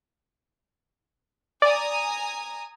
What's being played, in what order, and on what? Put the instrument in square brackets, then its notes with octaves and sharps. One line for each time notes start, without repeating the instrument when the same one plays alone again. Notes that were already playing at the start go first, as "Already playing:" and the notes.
[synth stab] D5 [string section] G#5 A#5 D#6